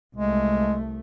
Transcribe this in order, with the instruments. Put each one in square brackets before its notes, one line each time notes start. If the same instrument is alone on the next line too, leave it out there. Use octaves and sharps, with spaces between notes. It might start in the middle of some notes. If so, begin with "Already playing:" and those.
[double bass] C2 A3 [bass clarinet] G#3